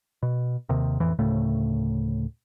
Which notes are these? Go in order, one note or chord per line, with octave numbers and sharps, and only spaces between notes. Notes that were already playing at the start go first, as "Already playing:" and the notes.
B2
D#2 C3 D#3
A1 F2 E3
D2 A2 C#3 A3